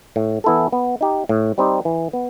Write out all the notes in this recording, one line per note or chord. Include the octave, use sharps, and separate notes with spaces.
A2
E3 B3 E4 A4
B3
D#4 G4
A2
G3 C4 D#4 G4
E3
B3